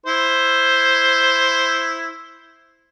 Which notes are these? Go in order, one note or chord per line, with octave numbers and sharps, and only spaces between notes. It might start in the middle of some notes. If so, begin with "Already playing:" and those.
E4 C5